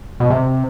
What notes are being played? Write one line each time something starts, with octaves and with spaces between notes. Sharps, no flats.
B2
C3